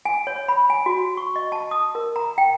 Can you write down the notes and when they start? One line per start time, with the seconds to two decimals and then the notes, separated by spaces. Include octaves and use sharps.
0.05 G#5
0.27 C#5
0.48 B5
0.70 G#5
0.86 F#4
1.17 C#6
1.36 D#5
1.52 A5
1.71 D#6
1.95 A#4
2.16 A#5
2.38 G5